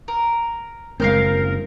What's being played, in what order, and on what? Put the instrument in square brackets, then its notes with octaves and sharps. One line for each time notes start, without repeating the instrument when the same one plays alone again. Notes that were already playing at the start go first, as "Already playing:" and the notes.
[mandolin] A#4
[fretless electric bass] F#1 G#3 C4 [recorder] A#4 [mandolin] F5 F6 G6